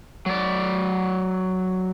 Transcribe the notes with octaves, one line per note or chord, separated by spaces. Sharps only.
F#3 D5